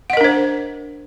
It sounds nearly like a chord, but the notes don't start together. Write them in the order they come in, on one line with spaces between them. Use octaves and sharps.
F#5 D#5 A#4 D4 C5